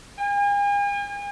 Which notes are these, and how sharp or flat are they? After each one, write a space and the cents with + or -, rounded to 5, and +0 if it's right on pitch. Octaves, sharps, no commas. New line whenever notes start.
G#5 -45